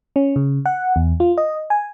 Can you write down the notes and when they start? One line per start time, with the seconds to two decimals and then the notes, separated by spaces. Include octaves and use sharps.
0.16 C#4
0.36 C#3
0.66 F#5
0.96 E2
1.20 F4
1.38 D#5
1.70 G#5